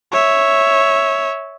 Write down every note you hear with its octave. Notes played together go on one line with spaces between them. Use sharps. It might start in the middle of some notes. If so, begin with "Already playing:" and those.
C#5 E5